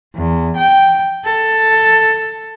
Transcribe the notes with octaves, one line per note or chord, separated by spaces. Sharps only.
E2
G5
A4